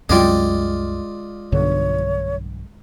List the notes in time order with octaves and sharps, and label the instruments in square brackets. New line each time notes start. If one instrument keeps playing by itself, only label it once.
[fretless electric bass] C2 F#2 F#3 [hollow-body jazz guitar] G#3 G5 [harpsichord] F4 D5 D#5
[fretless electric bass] B1 G2 D3 [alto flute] C#5